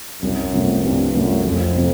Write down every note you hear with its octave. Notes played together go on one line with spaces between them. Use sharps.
C2 F#2
C3 F3 A3
C2 G2
F#2 C3 F3 A3
F1 F2
C3 F3